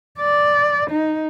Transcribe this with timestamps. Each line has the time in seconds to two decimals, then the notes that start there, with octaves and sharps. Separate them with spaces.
0.20 D5
0.91 D#4